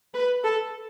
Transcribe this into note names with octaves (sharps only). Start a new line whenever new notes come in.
B4
A4